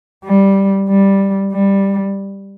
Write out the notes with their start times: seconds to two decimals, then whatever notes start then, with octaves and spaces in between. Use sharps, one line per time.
0.25 G3
0.89 G3
1.53 G3